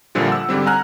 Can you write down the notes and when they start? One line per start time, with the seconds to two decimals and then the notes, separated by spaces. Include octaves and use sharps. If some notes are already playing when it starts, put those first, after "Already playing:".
0.15 A#1 A#2 D3 F3 G3
0.28 F#5 E6
0.49 G#2 D3 G3 C4
0.66 F#5 G#5 A#5 F6 F#6